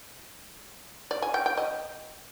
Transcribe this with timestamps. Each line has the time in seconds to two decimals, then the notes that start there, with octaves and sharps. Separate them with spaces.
1.11 D5
1.22 G#5
1.34 G5
1.46 G5
1.57 D#5